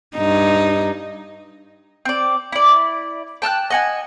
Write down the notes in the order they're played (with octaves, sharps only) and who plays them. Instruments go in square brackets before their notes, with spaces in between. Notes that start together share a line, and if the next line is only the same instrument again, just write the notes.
[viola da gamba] G2 D#4
[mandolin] C4 D5
E4 D5
G5 A5 F6 F#6
D#5 F#5 G#5